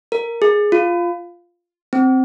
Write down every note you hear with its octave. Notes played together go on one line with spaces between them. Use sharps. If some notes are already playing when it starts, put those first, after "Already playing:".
A#4
G#4
F4
C4